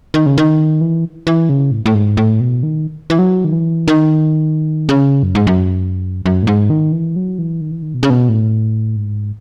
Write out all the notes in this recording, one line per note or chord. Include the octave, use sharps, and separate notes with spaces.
D#3
C#3
D#3
E3
E3
C#3
A2
A2
G#2
A2
B2
D#3
E3
F#3
D#3
E3
D#3
C#3
F#2
G#2
F#2
F#2
A2
G#2
D#3
E3
F#3
E3
D#3
E3
D#3
B2
C#3
B2
A2
G#2